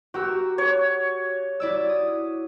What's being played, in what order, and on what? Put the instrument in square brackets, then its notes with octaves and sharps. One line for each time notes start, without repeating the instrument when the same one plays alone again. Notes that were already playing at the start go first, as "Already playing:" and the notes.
[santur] F#4 [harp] G4 A#4 E6
[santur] C#5
[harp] E4 D5 E6
D#6